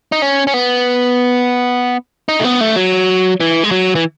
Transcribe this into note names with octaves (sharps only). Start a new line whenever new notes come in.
D#4
C#4
C#4
B3
D#4
A3
B3
A3
F#3
E3
G#3
F#3
E3